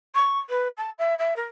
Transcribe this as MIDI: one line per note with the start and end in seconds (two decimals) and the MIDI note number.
0.15 0.39 85
0.49 0.68 71
0.77 0.90 81
0.98 1.14 76
1.19 1.34 76
1.36 1.45 70